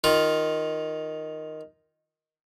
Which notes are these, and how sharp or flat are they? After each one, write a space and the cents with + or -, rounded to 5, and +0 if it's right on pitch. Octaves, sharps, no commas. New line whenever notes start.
D#3 +0 F4 +5